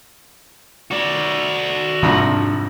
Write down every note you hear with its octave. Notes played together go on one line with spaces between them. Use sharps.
F#4 D5
C2 F2 G#2 D4